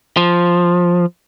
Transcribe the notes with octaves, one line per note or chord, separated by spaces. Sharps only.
F3